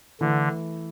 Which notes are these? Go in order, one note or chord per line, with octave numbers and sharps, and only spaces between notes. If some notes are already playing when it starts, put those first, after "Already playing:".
D3 E3 A3 E4